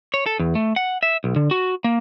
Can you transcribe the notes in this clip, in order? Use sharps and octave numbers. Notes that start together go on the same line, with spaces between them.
C#5
A4
E2
A3
F#5
E5
B1
D3
F#4
A#3